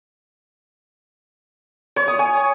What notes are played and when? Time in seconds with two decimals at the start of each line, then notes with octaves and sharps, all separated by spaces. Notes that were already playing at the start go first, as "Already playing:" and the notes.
1.96 C#5
2.08 D#6
2.19 G#5